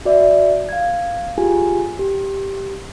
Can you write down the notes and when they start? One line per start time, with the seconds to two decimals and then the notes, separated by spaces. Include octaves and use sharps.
0.05 F#4 D5 E5
0.69 F5 G#6
1.38 F4 G4 G#4 G#5
1.99 G4